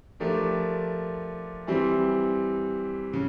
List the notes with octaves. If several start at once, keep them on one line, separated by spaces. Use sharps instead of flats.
F3 A3 D4 G4 A#4
E3 G3 C4
C#3